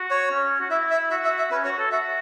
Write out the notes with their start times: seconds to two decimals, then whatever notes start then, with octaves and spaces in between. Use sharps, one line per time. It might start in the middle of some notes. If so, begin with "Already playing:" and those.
Already playing: F#4
0.10 C#5
0.31 C#4
0.60 F#4
0.70 E4 E5
0.91 E5
1.11 F#4 E5
1.24 E5
1.38 E5
1.51 C#4 B4
1.64 F#4 C#5
1.78 A4
1.91 F#4 E5